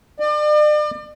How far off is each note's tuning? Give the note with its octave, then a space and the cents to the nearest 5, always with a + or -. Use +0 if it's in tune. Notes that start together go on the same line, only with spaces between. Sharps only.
D5 +40